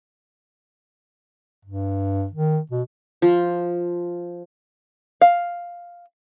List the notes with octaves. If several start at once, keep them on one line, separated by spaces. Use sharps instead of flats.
G2
D#3
B2
F3
F5